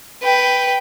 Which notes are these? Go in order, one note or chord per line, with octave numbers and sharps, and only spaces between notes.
B4 G5